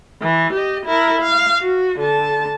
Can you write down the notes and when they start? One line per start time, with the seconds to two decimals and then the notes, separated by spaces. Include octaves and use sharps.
0.22 E3
0.53 G4 D#5
0.86 E4 A#4
1.21 F5
1.60 F#4
1.99 D3 A5